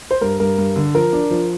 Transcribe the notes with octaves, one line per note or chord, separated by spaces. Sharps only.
C5
G2 A#4
G2 A#4
G2
D3
F3 A#4
D4
F3